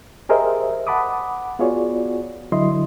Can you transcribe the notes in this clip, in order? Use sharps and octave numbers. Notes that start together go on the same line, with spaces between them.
G4 G#4 A#4 C5 D#5 E5
F#5 A5 B5 D6 D#6
B3 F4 F#4 G#4 C#5 D5
D3 F#3 E4 D#5 C6